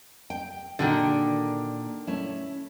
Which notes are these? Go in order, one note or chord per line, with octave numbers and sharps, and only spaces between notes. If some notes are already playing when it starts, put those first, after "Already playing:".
G5
A#2 D3 D#3 F#4 G#4
A3 C#4 E4